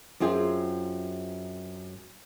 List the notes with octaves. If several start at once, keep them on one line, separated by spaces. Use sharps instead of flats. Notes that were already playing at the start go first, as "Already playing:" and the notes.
F#2 C4 F4 G#4